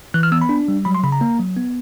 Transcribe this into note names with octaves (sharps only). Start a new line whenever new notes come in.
E3 F#6
F6
B3 E6
B5
D4
G3
F#3 B5
C6
C#3 B5
A#5
A#3
F#3
B3